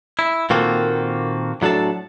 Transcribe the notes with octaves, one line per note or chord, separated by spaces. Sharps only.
E4
A#2 D#3 A#3 C4 F#4 A4
A2 F#3 D4 A4 A5